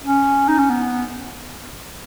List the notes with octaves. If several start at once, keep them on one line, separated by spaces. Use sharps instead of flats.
C#4
D#4
C#4
B3